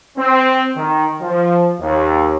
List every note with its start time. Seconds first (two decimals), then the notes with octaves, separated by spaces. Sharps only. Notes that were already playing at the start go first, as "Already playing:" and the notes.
0.18 C4
0.77 D#3
1.21 F3
1.80 D#2